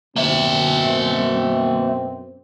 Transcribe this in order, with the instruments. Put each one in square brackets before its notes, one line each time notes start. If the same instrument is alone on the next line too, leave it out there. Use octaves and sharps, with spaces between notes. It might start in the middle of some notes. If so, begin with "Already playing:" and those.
[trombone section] F#2 B2 C4 [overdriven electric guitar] A#3 E5